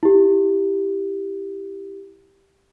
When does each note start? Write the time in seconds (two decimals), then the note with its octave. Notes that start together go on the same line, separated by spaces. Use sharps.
0.03 E4 G4